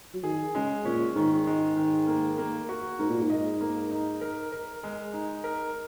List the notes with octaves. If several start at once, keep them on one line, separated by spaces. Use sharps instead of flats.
F#3
D#3 G#4
C#3 G#3
A#2 C#4
G#2 D#3
G#3
D#3
A#3
A#3
F#4
G#2 A#3
A#2
G#2
D#5
A#3
D#4
A#4
A#4
G#3
D#4
A#4